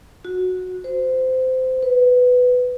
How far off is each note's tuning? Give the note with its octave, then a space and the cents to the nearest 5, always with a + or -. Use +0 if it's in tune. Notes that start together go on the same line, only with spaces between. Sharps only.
F#4 -10
C5 -20
B4 +10